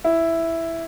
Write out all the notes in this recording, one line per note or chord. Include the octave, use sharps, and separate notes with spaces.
E4